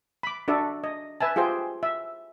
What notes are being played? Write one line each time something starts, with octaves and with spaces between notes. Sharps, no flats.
B5 D6
D4 F#4 A4 D5 E5
D#5
B4 E5 G#5 A5
F4 G4 G#4 C5 G5
E5